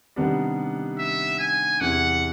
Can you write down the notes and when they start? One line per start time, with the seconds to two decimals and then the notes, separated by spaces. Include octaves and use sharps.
0.16 C3 D#3 G3 B3 D4
0.99 E5
1.40 G#5
1.81 E2 C3 E3 F#5